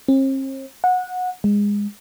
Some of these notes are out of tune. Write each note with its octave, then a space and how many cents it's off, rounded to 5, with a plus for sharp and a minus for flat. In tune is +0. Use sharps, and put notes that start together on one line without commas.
C4 +45
F#5 -20
G#3 -20